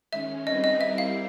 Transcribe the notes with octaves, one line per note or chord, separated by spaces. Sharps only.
D#3 G#3 C#4 E5
G3 C4 D#4 G#4 B4 D#5
D#5
G3 C4 E4 G4 A#4 E5
F5